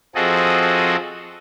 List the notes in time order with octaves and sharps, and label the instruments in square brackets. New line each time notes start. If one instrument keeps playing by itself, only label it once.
[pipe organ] F3 C4 F#4 G#4 A4 D#5